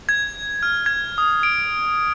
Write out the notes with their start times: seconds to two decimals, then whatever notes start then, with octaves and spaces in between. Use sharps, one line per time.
0.09 G#6
0.63 F6
0.86 G#6
1.18 D#6
1.43 D7